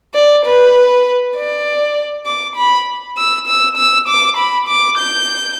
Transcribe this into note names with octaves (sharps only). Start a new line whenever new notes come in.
D5
B4
D5
D6
B5
E6
E6
E6
D6
B5
D6
G6